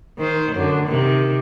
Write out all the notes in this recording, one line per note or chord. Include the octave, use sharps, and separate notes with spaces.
D#3 C5
F#2 D3
C3 D#3